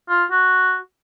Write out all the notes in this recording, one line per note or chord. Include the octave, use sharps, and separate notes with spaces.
F4
F#4